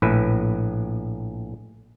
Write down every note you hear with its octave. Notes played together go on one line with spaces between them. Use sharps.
A#1 A2 B4